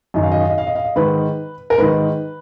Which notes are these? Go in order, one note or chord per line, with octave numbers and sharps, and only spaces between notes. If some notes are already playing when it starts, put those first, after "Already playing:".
F#2 D#3 D#5
F5
D#5
F5
D#5
F5
D#5
F5
D#5
G#2 D#3 B4
A#4
G#2 D#3 B4